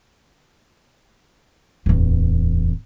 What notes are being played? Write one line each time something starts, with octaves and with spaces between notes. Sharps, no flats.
D1 E2